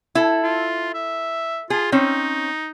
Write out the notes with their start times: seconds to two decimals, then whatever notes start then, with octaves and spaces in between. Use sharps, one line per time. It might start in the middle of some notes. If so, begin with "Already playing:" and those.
0.15 E4 A4
0.44 F4
0.94 E5
1.70 F4 G#4
1.92 C4 C#4 D#4